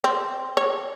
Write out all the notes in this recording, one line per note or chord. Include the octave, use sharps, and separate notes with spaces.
C4
C#5